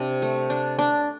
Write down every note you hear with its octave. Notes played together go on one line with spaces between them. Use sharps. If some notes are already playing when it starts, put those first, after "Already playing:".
Already playing: C3 D4
A3
D4
D4